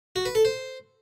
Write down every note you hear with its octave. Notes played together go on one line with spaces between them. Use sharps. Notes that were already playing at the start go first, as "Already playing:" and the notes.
F#4
B4
A4
C5